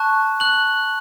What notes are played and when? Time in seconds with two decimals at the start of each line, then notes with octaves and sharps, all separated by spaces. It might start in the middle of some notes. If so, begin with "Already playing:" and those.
Already playing: A5 C#6 F#6
0.40 F#6 F#7